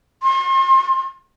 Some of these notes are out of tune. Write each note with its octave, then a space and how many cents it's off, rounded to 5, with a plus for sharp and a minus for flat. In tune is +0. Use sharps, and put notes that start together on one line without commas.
C6 +45